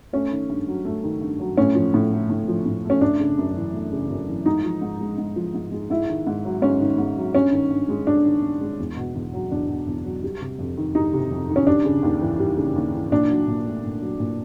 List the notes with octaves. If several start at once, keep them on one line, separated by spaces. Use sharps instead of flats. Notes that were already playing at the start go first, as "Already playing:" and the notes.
A3 C#4
D#3
G2
F#3
A3
D#3
G2
F#3
A2 C#4
F3
A2
A3
A2
F3
A2
A3
C#4
A3 D4
C#3
F#2
E3
A3
C#3
F#2
E3
G#2 D#4
F3
G#2
G#3
G#2
F3
G#2
G#3
G#2 E4
D#3
G#2
F#3
G#2 C#4
D#3
G#2
F#3
G2 C#4
D#3
G2
G#3
G2 D4
D#3
G2
G#3
E2
B2
E2
F#3
E2 D4
B2
E2
F#3
G3
C3
F2
D#3
G3 D#4
C3
F2
D#3
C#4
G3 D4
C#3
D#2
E3
G3
C#3
D#2
E3
A#2 D4
F#3
A#2
A3
A#2
F#3
A#2